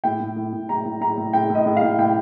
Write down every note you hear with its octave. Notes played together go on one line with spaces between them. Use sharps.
A2 G5
A2
A2
A2
A2 A#5
A2
A2 A#5
A2
A2 G5
A2
D#5
A2
F5
A2
A2 G5